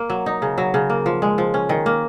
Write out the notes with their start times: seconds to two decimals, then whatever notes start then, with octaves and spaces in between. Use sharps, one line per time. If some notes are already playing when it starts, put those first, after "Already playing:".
Already playing: A#3
0.10 F#3
0.26 D#4
0.42 C#3
0.58 F#3
0.74 C#3
0.90 A#3
1.06 F3
1.22 G#3
1.38 F3
1.54 C#4
1.69 D#3
1.86 A#3